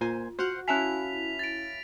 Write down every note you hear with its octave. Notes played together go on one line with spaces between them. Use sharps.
A#2 F4 C5 G#5
F#4 C5 F5 F#5
C#4 E4 F5 G#5 A5 F#6 B6 F7
A6 D7